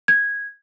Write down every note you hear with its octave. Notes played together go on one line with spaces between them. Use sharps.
G#6